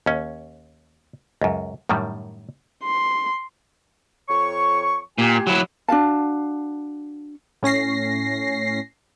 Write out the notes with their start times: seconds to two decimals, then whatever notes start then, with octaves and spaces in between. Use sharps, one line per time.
0.06 D#2 C#4
1.42 C#2 F#2
1.89 F#2 A2 D#3 G3
2.84 C6
4.29 F2 C#5 C#6
5.18 A#2 G4 G#5
5.47 F#3 E4
5.88 D4 F#4 F5 A5
7.63 A2 C#4 A#6 C7